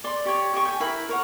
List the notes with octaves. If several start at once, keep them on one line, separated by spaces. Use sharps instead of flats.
D5 C6
G4 C#5
G4 D#5 C#6
G5 G#5
E4 A#4 B5
A#4 C#5 F#5